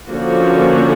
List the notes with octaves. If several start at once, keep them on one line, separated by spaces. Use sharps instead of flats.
D3 F3 A#3 C#4 F#4